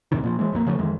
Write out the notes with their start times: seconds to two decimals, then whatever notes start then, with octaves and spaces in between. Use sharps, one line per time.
0.12 E2 A2 C3 D#3
0.23 A#2 F3
0.39 E3 G#3
0.52 A#1 F2 E3 A#3
0.67 C#3 F3 G3 A3
0.79 F2 D#3 E3 G#3